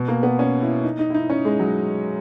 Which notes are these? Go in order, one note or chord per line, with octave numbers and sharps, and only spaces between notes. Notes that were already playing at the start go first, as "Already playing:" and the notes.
Already playing: B2
A#3
B3
C#4
E4
D#4
D#4
E4
D#4
C#4
G#3
F#3